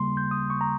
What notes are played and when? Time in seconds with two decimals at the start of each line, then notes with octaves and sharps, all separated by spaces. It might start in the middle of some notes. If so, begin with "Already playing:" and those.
Already playing: C#3 G3 A#3 C6
0.17 G6
0.31 D#6
0.50 C#6
0.61 A#5